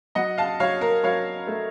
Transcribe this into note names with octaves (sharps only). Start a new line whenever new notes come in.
F#3 D#5 F#5
F5 A5
F#3 C#5 F5
A#4
F#3 C#5 F5
A3